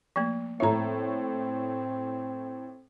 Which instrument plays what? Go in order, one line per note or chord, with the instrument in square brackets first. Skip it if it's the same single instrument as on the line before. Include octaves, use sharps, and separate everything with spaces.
[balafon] F3 A3 A#3
[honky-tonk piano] A2 C#5 [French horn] C4 [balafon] E5 A#5